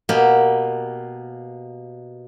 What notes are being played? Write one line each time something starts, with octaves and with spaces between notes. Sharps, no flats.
B2 A#3 G4